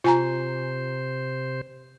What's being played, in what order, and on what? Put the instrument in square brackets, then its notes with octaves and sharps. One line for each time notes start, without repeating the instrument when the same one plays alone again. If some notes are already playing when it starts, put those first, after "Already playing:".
[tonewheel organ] C3 C5 [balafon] F4 G#5 A#5